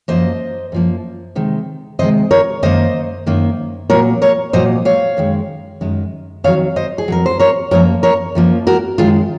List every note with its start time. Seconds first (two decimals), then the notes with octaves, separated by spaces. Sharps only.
0.08 F#2 F3 A#3 C5 D#5
0.72 F#2 F3 A#3
1.35 C3 D#3 G#3
1.99 C3 D#3 G#3 C5 D#5
2.31 A#4 C#5
2.63 F#2 D#3 A#3 C5 D#5
3.26 F#2 D#3 A#3
3.90 A#2 F#3 A#3 A#4 C#5
4.22 A#4 C#5
4.53 A#2 F#3 A#3 C5 D#5
4.85 C#5 F5
5.17 F#2 D#3 G#3
5.81 F#2 D#3 G#3
6.44 F2 D#3 F#3 C#5 F5
6.76 C5 D#5
6.98 G#4
7.08 F2 D#3 F#3 A#4
7.26 C5
7.39 A#4 C#5
7.71 F#2 F3 A#3 A#4 C#5
8.03 A#4 C#5
8.35 F#2 F3 A#3
8.67 F#4 A#4
8.98 F#2 D#3 G#3 F4 G#4